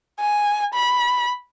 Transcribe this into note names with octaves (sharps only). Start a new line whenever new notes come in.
G#5
B5